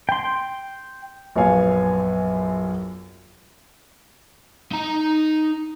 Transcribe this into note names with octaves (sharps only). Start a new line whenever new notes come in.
G5 C6
A#1 F#2 B3 C#5 F5 G#5
D#4 A#5